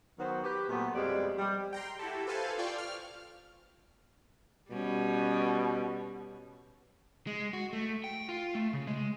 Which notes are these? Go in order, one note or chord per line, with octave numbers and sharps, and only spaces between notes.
D#3 F#3 B3 F#4 C5
G4 B4
A#2 F#3 A3 B3
F2 B2 G3 G#3 D5
G3
G5 A#5 C6
E4 F#4 G4 A4
A4 B4 C5 F5 G#5 A5
F4 D5 F5 G5 C#6
F6
B2 G3 C#4
G#3
F#4
A3
G5
F4
A3
C#3
G#3